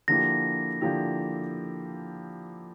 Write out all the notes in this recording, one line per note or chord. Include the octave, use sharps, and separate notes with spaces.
D3 F3 A#3 E4 G4 A#6
D3 F3 A#3 E4 G4